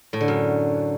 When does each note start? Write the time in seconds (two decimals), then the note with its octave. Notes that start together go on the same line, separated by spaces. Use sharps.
0.13 A2
0.21 D3
0.28 F#2